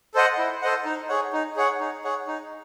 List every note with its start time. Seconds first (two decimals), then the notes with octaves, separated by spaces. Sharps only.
0.14 A4 C5 D#5 F#5
0.38 E4
0.62 A4 C5 D#5 F#5
0.85 D#4
1.09 G#4 C#5 F#5
1.33 D#4
1.56 G#4 C#5 F#5
1.80 D#4
2.04 G#4 C#5 F#5
2.28 D#4